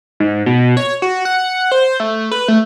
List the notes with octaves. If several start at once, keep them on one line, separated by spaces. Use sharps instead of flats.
G#2
B2
C#5
F#4
F#5
C5
A3
B4
A3